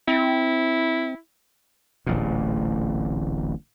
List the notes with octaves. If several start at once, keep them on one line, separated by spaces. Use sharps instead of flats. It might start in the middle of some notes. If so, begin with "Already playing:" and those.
C4 E4
D1 A1 A#2